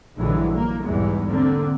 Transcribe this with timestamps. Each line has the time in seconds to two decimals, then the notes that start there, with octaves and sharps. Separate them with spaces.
0.18 A#1 G2 D3 E3 F#3 G#3
0.54 A#3
0.83 B1 E2 G#2 E3 G3 G#3
1.27 D3 A#3 C4